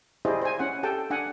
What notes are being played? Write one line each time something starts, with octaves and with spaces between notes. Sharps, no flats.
E4 G4 G#4 C5 D5 D#5
C5 G#5
C#4 E4 F#5
G4 A4 G5 A5
D4 F#5 G#5